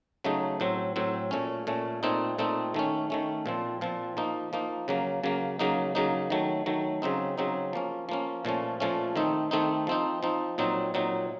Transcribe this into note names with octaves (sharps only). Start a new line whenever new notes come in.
C#3 F#3 A3 D#4
A2 F#3 C4
A2 F#3 C4
A#2 A3 C#4
A#2 A3 C#4
A#2 A3 C4 D#4
A#2 A3 C4 D#4
D#3 A3 C#4
D#3 A3 C#4
A#2 F3 C4
A#2 F3 C4
F3 A#3 D#4
F3 A#3 D#4
C#3 F#3 A#3
C#3 F#3 A#3
C#3 F#3 A#3 D#4
C#3 F#3 A#3 D#4
D#3 F#3 A3
D#3 F#3 A3
C#3 F#3 C4 D#4
C#3 F#3 C4 D#4
F3 A#3 C#4
F3 A#3 C#4
A#2 F3 A3 C#4
A#2 F3 A3 C#4
D#3 A3 C4 D#4
D#3 A3 C4 D#4
F3 C4 D#4
F3 C4 D#4
A#2 F#3 C4 D#4
A#2 F#3 C4 D#4